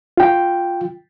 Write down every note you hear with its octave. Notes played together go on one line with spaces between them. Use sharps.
F4 G5